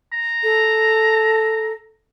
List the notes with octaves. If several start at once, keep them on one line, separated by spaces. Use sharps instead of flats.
A#5
A4